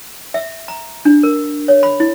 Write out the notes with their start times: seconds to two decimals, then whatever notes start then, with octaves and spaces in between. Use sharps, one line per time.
0.34 E5
0.68 A#5
1.05 D4
1.23 A#4
1.68 C#5
1.83 B5
2.00 E4